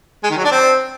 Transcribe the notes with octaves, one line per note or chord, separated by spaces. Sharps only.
G#3
D#3
F#3
D4
C4